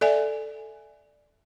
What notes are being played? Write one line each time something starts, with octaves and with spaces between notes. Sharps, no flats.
A4 D5 E5 G#5